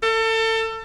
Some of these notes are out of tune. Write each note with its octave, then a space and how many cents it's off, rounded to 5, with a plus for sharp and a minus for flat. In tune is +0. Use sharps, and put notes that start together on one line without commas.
A4 +30